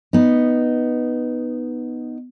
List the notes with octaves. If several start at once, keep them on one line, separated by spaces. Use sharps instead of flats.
B3 D#4